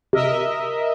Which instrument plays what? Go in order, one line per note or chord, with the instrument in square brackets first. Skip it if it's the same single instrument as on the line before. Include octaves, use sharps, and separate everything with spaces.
[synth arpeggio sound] C3 [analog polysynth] A#4 D#5 E5